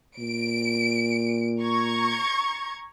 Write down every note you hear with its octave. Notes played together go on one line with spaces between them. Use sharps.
A#2 D7
A#5 C#6 G#6